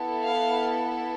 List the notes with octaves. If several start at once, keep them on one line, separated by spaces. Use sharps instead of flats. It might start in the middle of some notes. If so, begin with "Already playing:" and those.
Already playing: B3 E4 A4
F5